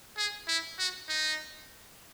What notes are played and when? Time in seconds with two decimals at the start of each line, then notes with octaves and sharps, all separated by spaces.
0.17 G#4
0.48 E4
0.79 F#4
1.09 D#4